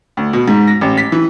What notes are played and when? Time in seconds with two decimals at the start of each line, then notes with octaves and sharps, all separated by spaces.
0.17 D2
0.33 B2
0.48 G#2
0.67 A#6
0.81 A1
0.98 B6
1.12 E3